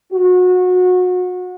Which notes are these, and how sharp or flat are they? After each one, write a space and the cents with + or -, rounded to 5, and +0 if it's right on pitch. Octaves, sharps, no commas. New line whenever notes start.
F#4 -25